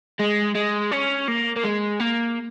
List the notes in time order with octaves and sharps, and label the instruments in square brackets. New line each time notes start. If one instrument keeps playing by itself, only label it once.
[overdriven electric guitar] G#3
G#3
C#4
A#3
A#3
G#3
A#3